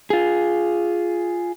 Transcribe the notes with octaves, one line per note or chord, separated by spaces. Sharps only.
F4 G#4